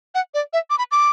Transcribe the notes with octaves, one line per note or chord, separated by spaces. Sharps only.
F#5
D5
E5
D6
B5
D6